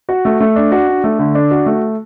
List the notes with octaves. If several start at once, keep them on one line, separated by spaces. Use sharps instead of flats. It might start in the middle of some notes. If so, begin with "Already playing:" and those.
F#4
A3
A3
D4
F#4
D4
A3
D3
D4
F#4
A3